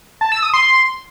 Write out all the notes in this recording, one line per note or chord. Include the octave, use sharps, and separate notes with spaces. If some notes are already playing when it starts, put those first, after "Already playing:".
A5
E6
D#6
C6